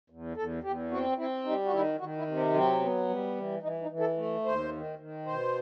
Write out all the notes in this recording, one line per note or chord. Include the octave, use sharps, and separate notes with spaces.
E2
E2 A4
E2 G4
C4 F#4
C4 E4
G3 D#4
F#4
D#3 E4
D#3 F#4
E4
C3
C4
F#3 C4
B3
G3
E3
E3 D#4
D#4
E3
A4
A3
D#2 C5
D#3
D#3
B2 C5